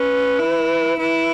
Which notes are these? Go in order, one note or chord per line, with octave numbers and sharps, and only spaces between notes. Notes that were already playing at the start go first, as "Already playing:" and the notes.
Already playing: C#4 B4
E4
E4 B4